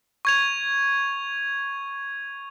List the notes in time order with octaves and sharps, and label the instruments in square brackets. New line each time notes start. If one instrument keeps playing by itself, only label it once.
[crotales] C#6 G#6 F7